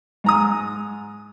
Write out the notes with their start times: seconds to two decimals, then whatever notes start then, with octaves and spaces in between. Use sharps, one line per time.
0.24 G#2 A#5 D#6